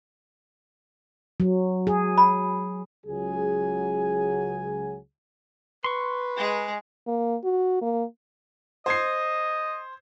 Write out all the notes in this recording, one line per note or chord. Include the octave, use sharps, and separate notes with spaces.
F#3
G#4
B5
C#2 F#3 G#4 G#5
B4 C6 C#6
G#3 G#4
A#3
F#4
A#3
C5 D#5 G#6 C7